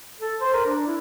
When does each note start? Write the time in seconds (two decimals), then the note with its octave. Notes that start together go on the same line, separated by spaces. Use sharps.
0.20 A4
0.41 C5
0.53 A#4
0.65 D4
0.87 E4